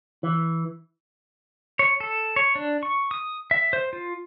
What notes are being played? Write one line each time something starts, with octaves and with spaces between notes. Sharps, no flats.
E3
C#5
A4
C#5
D4
C#6
D#6
E5
C5
F4